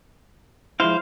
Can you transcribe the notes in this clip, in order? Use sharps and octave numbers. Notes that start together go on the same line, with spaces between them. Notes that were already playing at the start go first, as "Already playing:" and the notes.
F3 G#3 E4 C5 F5